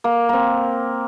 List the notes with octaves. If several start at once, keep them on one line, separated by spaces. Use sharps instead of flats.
A#3
A#3 C4